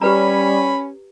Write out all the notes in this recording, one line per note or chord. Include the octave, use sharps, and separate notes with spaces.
G3 C#4 G4 B4 A#5 B5